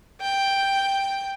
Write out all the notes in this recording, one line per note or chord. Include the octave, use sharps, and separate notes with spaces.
G5